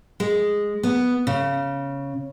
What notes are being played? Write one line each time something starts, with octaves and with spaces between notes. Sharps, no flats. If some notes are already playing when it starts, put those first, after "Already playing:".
G#3
B3
C#3